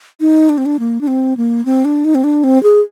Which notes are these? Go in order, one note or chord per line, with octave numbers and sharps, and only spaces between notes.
D#4
D4
C4
D4
A#3
D4
C4
A#3
C4
D4
D#4
C4
D4
C4
G#4